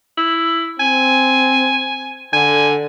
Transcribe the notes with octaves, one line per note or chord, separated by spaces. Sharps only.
E4
C4 G#5
D3 G#5